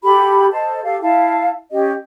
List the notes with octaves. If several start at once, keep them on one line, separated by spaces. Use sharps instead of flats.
F#4 G4 A4 B5
A4 C5 D#5 A5
G4 A4 F5
E4 F5 A5
C#4 G4 D#5